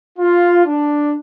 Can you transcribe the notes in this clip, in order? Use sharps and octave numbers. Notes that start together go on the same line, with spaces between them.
F4
D4